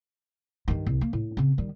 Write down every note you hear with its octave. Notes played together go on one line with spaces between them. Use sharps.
G2 D#3
C2
A#3
A2
C#3 C4
D#3 G3